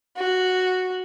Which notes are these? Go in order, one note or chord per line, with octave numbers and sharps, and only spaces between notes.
F#4